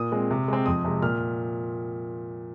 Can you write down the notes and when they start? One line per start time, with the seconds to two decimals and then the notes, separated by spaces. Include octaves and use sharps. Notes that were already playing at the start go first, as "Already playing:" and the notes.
Already playing: A#2 D#6
0.12 G#3 C4
0.31 C3
0.48 G#3 C4
0.66 F2 D#6
0.85 C3 G#3
1.02 A#2 F6